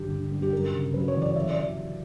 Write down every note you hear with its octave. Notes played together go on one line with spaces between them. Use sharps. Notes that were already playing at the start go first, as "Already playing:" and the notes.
Already playing: G2 D3 G4
D3
G2
G4
F#2 A#4
C#3
F#2 B4
C#5
E3
D5
F#2 E5
D5
E3